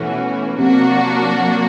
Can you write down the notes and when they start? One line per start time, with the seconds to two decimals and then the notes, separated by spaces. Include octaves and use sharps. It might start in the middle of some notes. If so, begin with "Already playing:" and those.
Already playing: B2 E3 A3 C#4 F#4
0.58 C3 F#3 A#3 D4 F#4